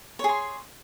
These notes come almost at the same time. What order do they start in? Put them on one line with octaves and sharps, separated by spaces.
C#5 G#4 C6